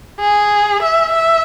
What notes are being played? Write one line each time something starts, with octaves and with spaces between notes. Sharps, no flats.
G#4
E5
E5